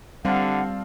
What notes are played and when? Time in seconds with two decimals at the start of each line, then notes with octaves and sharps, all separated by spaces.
0.25 D3 G3 C4 F5 F#5 A5